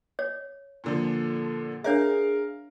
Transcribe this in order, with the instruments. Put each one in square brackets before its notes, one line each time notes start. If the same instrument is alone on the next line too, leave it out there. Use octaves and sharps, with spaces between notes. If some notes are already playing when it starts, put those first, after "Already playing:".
[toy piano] C#5
[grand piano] A#2 D3 F3
[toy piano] D4 C#5 E5 [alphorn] G#4 [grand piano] A#4 F5